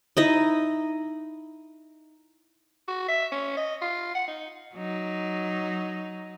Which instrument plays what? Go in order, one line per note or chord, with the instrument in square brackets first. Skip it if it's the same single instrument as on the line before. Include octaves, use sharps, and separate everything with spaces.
[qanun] D#4 E4 D#5
[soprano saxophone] F#4
E5
C#4
D#5
F4
F#5
D#4
[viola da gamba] F#3 D#4